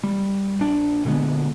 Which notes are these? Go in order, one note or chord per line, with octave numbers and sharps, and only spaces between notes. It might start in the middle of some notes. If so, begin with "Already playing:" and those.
G3
A#1 D4
A#2 D3 G#3 B3